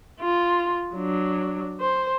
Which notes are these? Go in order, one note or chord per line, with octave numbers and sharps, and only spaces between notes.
F4
F#3 D4
C5